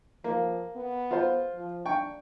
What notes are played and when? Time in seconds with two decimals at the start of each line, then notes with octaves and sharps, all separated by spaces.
0.24 F3 A#3
0.76 B3
1.11 F4 C5
1.54 F3
1.86 D4 G5 C#6